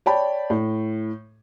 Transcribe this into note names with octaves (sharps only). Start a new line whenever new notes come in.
C#5 D5 G5 A5 B5
A2